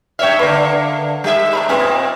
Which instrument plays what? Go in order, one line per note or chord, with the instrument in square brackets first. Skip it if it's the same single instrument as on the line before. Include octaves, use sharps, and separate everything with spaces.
[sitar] G2 C#5 E5 [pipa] F5 G5
[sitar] D3 A#3 [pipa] B4 D5
[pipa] D#3 [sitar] G3 E5
[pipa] A3 A#5 B5
[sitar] A#2 C4 [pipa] G#3 B3 G#4